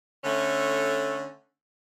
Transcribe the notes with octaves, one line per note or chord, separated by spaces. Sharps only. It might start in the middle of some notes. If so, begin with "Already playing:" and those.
D3 A3 C#4